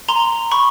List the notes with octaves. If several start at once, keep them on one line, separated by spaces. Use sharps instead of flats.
A#5 C6
B5 C#6